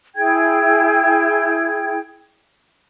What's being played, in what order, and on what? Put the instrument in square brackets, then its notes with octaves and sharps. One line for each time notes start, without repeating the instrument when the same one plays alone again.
[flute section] E4 G#4 G5 G#6